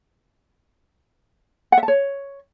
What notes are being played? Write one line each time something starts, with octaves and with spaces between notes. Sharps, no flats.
F#5
E5
A5
C#5